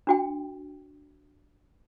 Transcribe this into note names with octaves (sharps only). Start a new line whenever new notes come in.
D4 F#4 G5